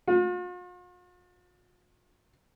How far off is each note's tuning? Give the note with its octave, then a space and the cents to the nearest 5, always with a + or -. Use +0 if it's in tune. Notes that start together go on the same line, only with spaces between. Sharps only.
F4 +45